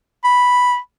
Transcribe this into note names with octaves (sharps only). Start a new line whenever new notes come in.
B5